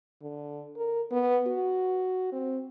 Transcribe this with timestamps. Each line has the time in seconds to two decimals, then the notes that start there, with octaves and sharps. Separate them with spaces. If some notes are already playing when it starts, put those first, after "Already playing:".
0.22 D3
0.76 A#4
1.11 B3
1.47 F#4
2.32 C4